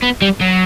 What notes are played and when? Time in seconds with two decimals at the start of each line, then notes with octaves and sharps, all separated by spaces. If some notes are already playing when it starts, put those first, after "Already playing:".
0.02 B3
0.22 G3
0.41 F#3